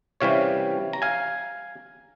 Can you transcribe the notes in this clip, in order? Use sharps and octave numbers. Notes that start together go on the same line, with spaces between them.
C3 E3 G3 C#4 C#5 F5
A#5
F5 G#5